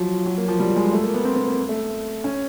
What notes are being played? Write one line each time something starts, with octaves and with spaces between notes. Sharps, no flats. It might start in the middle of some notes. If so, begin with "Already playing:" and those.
Already playing: F3 F#3
F#3
A#3
F3
G3
G#3
A3
A#3
B3
C4
C4
A#3
A3
C#4